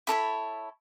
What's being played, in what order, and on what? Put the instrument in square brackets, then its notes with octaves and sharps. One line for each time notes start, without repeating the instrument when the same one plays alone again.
[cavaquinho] E4 A4 C#5 B5